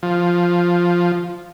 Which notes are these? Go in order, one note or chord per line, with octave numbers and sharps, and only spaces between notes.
F3